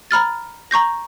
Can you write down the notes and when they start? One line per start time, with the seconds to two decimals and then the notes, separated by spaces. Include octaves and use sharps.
0.11 A#5 B5 F6 A6
0.71 A#5 C#6 G6 A#6